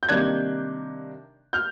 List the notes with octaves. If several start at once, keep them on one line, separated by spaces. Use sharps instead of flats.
G6
C3 D#3 G3 A#3 D4 F#6 G#6
F6 G6